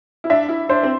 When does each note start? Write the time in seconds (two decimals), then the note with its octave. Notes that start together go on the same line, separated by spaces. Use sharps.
0.24 E4
0.30 D4 E5
0.49 E4
0.69 D4 C5
0.83 C4